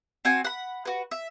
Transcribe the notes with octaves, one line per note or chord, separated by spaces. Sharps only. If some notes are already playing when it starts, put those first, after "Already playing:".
C4 F#4 G#5
F#5 B5
F#4 B4
E5